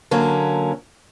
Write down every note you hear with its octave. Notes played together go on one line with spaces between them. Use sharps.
D3 F#3 A#3 C#4